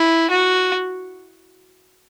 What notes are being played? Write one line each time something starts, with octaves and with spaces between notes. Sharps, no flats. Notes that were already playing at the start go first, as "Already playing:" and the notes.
Already playing: E4
F#4